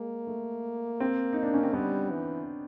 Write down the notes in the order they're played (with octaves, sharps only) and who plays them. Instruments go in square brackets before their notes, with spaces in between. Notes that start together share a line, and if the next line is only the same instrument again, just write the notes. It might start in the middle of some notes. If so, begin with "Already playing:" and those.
Already playing: [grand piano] G#3 [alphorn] A#3
[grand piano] A3
C4
D#4
D4
C#4
C4
[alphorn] G3 [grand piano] B3
[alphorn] E3